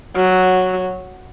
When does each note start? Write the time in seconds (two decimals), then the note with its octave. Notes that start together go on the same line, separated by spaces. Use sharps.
0.15 F#3